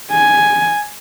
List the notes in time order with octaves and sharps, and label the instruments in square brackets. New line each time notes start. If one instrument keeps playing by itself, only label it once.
[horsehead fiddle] G#5